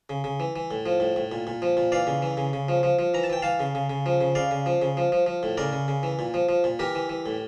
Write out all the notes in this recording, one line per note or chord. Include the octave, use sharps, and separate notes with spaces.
C#3
C#3
E3
E3
A2
F3
A2
A2
A#2
A#2
F3
A#2
E3 D5 F5
C#3
E3
C#3
C#3
F3
F3
F3
E3 A#5
A5
E3 G5
E3 F5 A5
C#3
C#3
C#3
F3
C#3
C#3 D5 F5
C#3
F3
C#3
F3
F3
F3
A2
C#3 A#4 D5
C#3
C#3
E3
A#2
F3
F3
A#2
E3 G4 A#4
E3
E3
A2